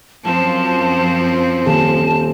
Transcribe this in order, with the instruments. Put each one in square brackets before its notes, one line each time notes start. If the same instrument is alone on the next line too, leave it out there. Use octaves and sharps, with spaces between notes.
[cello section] F#2 F3 [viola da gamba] C4 [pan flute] A5
[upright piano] D#1 [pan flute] A5